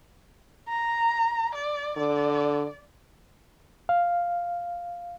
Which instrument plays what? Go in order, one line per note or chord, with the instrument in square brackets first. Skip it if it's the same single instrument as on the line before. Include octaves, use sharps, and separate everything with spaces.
[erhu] A#5
D5
[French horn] D3 [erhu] D5
[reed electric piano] F5